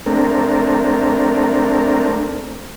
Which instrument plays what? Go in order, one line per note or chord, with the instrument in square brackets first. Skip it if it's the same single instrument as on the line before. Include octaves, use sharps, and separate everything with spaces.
[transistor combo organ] A3 C4 D4 A#4